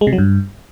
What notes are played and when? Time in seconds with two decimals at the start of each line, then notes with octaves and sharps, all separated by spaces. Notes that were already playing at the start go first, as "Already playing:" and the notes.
0.01 G#3
0.07 C3
0.13 F#3
0.18 G2